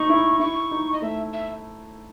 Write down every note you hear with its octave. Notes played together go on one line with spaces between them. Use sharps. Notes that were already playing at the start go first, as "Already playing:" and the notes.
Already playing: D#4 C#6
E4
E4 C#6
D#4
D#5
A3 E5
E5